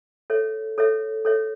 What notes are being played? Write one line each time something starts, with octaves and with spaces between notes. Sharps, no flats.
A4 C#5 E5
A4 C#5 E5
A4 C#5 E5